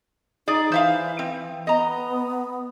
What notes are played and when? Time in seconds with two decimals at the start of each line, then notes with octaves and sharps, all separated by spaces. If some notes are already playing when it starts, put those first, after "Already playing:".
0.48 D#4 G#4 D5
0.72 E3 C5 E5 F5
1.19 C4
1.67 B3 D#5 A#5